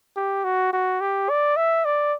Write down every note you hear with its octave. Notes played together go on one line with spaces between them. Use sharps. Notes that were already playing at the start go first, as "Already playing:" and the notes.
G4
F#4
F#4
G4
D5
E5
D5